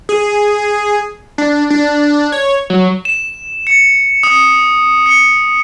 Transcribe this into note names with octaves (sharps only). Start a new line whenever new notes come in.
G#4
D4
D4
C#5
F#3
E7
C#7
D#6
C#7